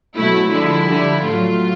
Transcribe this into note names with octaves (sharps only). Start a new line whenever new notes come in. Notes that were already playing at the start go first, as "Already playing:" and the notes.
B2 F#3 A3 E4
D3 F3 G#3 E4
D3 G3
A2 F#3 A3 F4